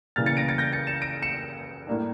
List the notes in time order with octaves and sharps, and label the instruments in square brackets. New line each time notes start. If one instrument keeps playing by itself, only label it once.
[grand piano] C#3 E3 G3 A#3 F6 A6
A6 C#7
A#6 D7
A6 C#7
G6 A#6
A6 C#7
C#7 E7
A#6 D7
C#7 E7
A2 G3 A#3 D4